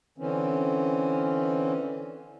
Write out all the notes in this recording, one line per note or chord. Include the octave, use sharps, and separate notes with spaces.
D3 E3 C4 C#4